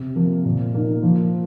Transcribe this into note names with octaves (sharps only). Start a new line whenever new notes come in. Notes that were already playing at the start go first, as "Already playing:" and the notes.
Already playing: C3
F3 A#3
A#2
A#3 D#4
F3